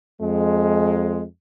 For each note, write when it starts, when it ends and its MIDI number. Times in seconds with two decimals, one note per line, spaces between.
0.22 1.24 41
0.22 1.24 56